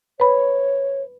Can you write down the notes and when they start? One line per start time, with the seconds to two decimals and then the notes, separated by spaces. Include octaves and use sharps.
0.20 B4 C#5 B5